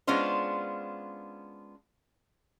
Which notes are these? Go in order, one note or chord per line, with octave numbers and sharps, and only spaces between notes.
G#3 B3 C#4 D4 F4 C5